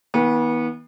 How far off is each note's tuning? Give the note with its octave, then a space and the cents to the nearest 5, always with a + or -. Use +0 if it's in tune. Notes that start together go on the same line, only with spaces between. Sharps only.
D#3 +45 B3 -30